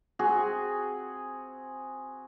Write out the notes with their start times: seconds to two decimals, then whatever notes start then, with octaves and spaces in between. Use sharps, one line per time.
0.19 C4 F#4 G#4